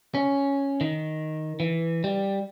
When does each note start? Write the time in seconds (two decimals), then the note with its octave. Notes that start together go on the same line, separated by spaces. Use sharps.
0.15 C#4
0.81 D#3
1.60 E3
2.04 G3